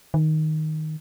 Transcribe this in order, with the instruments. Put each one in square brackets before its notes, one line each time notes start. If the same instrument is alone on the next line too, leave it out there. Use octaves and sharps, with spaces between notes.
[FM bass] D#3